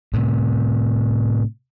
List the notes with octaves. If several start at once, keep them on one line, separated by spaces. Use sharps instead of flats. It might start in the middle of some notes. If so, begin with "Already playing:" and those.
A2 C3